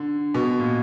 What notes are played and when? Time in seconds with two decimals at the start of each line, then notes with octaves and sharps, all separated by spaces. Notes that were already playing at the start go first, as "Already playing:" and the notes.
Already playing: D3
0.34 B2
0.59 A#2